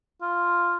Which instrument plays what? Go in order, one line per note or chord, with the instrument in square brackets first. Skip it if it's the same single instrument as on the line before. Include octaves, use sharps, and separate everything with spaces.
[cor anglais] F4